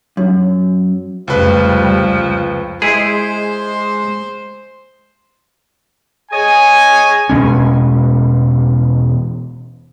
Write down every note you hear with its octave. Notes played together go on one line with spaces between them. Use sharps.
F#2
F1 C#2 F3 G3 B4
G#3 E4 G#4 C5
G#4 C#5 D#5 G#5
E1 B2 G#3 C#4